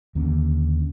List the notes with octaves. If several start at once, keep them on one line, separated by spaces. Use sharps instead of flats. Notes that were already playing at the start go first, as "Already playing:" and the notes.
D#2 D3 A#3 C#4